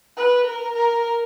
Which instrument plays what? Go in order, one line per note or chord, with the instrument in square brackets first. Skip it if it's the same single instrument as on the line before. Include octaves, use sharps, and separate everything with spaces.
[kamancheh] B4
A#4
A#4